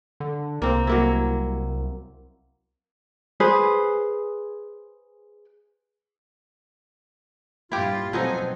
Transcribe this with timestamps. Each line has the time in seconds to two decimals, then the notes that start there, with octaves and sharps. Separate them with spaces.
0.20 D3
0.62 C2 A#3 C4
0.87 F#3 A#3 E4
3.40 G#4 B4 C5
7.72 G2 A#2 E4 F4 G4
8.13 B2 F3 F#3 C4 D#4 A4 G#5